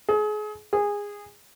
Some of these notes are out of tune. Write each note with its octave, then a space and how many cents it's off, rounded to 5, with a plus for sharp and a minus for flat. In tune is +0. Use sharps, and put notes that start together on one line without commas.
G#4 +30
G#4 -20